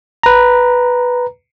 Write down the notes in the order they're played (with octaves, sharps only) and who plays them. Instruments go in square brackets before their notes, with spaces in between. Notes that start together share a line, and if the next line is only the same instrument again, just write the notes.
[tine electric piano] B4 A#5